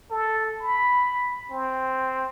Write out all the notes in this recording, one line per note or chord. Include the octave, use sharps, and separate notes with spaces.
A4
B5
C4